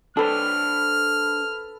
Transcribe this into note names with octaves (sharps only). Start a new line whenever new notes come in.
D4 A4 B4 C5 G5 F6